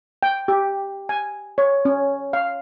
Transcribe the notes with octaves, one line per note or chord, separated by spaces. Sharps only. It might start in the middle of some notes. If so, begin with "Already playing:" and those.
G5
G4
G#5
C#5
C#4
F5